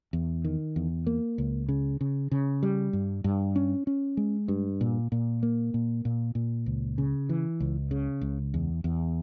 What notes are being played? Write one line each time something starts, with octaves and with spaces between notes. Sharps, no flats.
E2
D#3
E2
A#3
C#2
C#3
C#3
C#3
G3
G2
G2
C#4
C#4
G#3
G2
A#2
A#2
A#3
A#2
A#2
A#2
C#2
C#3
E3
C#2
C#3
C#2
E2
E2